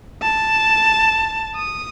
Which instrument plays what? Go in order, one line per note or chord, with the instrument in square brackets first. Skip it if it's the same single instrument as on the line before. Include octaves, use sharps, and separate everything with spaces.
[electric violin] A5
D#6